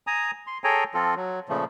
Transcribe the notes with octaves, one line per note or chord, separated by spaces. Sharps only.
G#5 A#5 D#6
C6
G#4 A4 C#5 G5 G#5 A#5
F3 C4 F4 A4
F#3
A#2 C#3 F3 A3